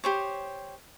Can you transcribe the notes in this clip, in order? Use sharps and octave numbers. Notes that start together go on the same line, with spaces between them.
G4 C5 C#5